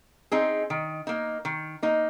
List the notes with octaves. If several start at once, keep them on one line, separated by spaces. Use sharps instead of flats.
C4 D#4 G#4
D#3
A#3 D#4
D#3
A#3 D#4